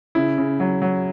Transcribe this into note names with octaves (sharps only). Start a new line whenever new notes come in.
C#3 E4
C#3
F#3
F#3